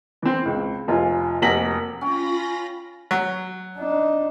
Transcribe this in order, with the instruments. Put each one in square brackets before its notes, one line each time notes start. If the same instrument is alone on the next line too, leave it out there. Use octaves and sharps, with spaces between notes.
[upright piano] E3 C4
C#2
F1 F4 G#5
F1 A#3 F#4 A#6 B6 F#7
[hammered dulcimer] C#4 G5 [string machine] F4 B5 A#6
[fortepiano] F#3
[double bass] D4 D#4